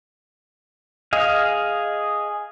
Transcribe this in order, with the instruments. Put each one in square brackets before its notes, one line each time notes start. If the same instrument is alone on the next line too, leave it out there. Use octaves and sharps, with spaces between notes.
[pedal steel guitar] G#4 D#5 F5